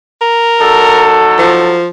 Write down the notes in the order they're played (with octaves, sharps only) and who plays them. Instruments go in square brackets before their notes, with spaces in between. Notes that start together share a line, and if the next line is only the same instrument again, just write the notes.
[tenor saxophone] A#4
[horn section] F#3 D#4 A4
[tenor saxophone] F3